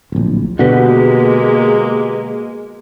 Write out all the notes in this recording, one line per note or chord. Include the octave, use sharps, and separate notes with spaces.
D1 A#1
B2 D3 G#3 A#3 F#4 G4 B4